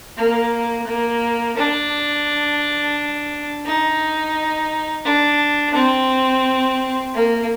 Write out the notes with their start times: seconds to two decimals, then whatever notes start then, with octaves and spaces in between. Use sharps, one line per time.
0.17 A#3
0.87 A#3
1.57 D4
3.65 D#4
5.05 D4
5.74 C4
7.14 A#3